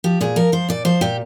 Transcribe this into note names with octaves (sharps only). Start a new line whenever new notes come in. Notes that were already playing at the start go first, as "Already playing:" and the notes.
F3 G4
A#2 G#4
F3 A#4
F3 C5
A#2 D5
F3 C5
A#2 G4